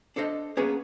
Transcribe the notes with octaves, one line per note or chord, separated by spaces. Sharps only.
D4 A4 C5 D#5
A#3 B3 C#4 G#4 B4